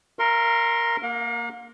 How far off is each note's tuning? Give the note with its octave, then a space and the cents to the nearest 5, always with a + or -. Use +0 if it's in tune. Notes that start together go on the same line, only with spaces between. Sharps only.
A#4 +0 F5 -45 C6 +20
A#3 +0 F5 +45